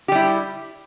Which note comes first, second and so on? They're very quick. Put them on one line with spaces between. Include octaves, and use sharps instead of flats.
G4 G3 E4